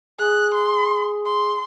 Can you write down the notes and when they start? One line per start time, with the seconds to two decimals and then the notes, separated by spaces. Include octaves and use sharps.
0.19 G#4 G#5 D#6 F#6
0.54 C6
1.26 C6